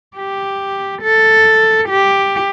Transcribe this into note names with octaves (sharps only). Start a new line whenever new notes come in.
G4
A4
G4